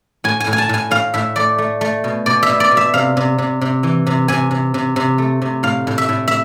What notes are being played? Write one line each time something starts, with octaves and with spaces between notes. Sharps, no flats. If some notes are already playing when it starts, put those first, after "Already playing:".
A2 G#5
G#5
A2
G#5
A5
A2 G#5
A2 F5
A2 E5
A3 D5
A3
A3
B2
B2 D5
E5
B2
D5
B2
E5
C3 F5
C3
C3
C3
E3
C3
C3 G#5
C3
C3
C3
A3
C3
A2 F5
A2
E5
A2
E5